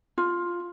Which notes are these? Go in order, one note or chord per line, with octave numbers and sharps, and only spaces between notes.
F4